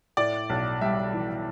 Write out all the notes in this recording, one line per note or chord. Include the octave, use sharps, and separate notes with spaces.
A2 D5
B1
G3 E5
E3